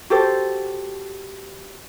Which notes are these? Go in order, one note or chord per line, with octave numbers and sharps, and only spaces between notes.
F#4 G4 A4 C5